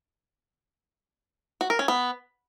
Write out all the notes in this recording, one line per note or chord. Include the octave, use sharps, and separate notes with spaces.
F#4
A#4
C#4
B3